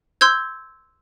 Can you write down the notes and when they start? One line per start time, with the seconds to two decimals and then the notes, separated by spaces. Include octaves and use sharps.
0.21 C6 E6 G6 G#6